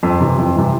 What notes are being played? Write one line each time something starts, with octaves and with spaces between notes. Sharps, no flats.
F2
C3 E3
F2
C3 E3